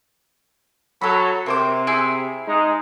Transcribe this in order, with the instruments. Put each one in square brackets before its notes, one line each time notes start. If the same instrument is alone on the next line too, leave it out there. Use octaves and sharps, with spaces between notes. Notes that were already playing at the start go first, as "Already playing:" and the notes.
[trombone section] F#3 [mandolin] A4 B5
[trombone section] C3 [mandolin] A#3 C5 D6
[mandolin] E4 G#4
[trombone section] G#3 D#4